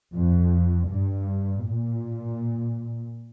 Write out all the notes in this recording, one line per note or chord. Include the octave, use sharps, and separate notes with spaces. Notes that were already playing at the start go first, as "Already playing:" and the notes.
F2
G2
A#2